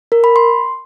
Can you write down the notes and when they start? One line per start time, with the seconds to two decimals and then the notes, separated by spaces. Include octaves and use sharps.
0.12 A#4
0.24 B5
0.36 C6